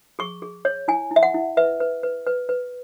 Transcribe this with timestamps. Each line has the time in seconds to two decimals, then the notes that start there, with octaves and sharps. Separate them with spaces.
0.19 G#4 C#6
0.42 G#4
0.65 C#5
0.88 E4 G#5
1.11 E4
1.16 E5
1.23 F#5
1.34 E4
1.57 B4 E5
1.80 B4
2.03 B4
2.27 B4
2.49 B4